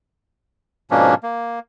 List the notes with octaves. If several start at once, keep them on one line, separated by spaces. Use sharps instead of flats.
G#2 B2 F3 A#3 C#4 D4
A#3